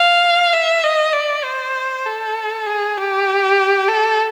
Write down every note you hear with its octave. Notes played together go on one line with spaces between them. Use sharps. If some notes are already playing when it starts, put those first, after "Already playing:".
Already playing: F5
E5
D#5
D5
C5
A4
G#4
G4
A4